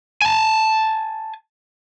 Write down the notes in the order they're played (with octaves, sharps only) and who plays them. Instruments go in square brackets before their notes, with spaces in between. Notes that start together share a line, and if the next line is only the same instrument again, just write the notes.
[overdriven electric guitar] G#5 A5